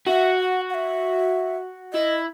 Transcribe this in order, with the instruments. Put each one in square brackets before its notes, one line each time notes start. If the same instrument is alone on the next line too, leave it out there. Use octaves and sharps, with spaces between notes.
[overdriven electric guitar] F#4 [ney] E5
[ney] F#5
F#5
E5
[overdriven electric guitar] E4 [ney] D#5